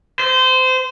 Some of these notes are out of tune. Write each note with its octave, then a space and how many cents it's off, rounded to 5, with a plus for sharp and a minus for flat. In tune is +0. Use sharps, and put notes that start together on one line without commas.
C5 -25